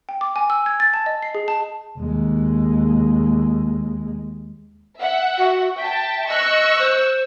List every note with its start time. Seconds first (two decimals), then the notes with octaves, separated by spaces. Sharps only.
0.09 G5
0.21 D6
0.36 G#5
0.50 E6
0.66 G#6
0.80 A6
0.94 A5
1.06 D#5
1.23 C7
1.35 G#4
1.48 A5
1.99 D#2 G#3
5.00 E5 F#5
5.38 F#4
5.77 E5 G5 A5
6.29 D#5 C#6 E6 F#6
6.79 C5